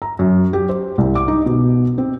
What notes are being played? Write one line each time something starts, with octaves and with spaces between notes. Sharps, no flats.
A#5
F#2
G4
C5
C2
D6
D#4
B2
C4